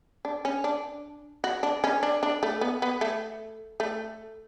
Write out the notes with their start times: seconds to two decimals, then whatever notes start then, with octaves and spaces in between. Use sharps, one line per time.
0.25 D4
0.45 C#4
0.64 D4
1.44 F#4
1.63 D4
1.84 C#4
2.03 D4
2.23 D4
2.43 A3
2.61 B3
2.82 B3
3.01 A3
3.80 A3